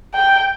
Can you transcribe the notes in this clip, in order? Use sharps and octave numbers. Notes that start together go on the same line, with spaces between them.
G5